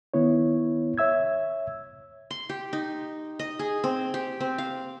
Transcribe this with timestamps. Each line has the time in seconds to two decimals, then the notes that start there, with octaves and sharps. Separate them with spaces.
0.14 D#3 B3 E4 C#5
0.98 C#5 E5 E6 G#6
2.31 C6
2.49 G4
2.73 D#4
3.39 D#5
3.59 G#4
3.84 C4
4.14 G4
4.40 C4
4.58 F5